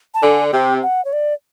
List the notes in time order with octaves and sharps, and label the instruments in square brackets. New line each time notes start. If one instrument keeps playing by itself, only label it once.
[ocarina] A5
[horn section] D3 [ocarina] G#5
[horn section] C3 [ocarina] G5
[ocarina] F#5
C#5
D5